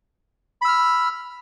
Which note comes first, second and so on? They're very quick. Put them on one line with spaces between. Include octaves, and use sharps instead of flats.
B5 E6 F6